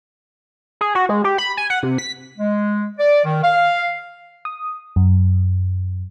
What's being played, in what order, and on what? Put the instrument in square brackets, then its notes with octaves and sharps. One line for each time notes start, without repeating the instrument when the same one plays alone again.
[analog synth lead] G#4
F#4
G#3
G4
B5
G#5
F#5
C3
B6
[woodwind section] G#3
D5
D#3
F5
[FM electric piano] D#6
F#2